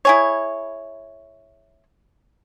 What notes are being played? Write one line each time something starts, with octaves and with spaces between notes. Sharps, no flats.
E4 G#4 C#5